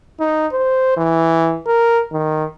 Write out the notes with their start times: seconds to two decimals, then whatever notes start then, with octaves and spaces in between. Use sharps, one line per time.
0.20 D#4
0.52 C5
0.97 E3
1.67 A#4
2.13 D#3